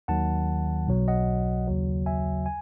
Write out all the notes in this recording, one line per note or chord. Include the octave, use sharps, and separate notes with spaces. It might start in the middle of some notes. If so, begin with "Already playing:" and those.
D#2 D#3 F#3 F#5 A5
B1 B2 F#3
D#5 F#5
D#2 C#3 F#3
E5 G#5
G#5